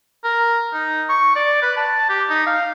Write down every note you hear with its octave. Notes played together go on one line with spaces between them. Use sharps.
A#4
D#4
C#6
D5
B4
A5
G4
D#4
F5